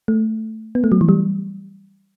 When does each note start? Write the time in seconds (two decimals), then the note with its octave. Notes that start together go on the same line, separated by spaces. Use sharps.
0.08 A3
0.75 B3
0.84 A3
0.92 F#3
1.01 E3
1.09 G3